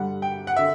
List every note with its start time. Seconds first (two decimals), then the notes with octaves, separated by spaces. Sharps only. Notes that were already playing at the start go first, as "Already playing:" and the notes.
Already playing: G2 D3 G3 F#5
0.22 G5
0.47 F#5
0.56 D3 E5